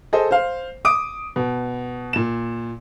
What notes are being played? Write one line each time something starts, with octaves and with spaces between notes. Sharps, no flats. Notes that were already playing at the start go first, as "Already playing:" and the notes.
G#4 A4 C5 D#5
C5 F5
D6 D#6 D7
B2
A#2 E7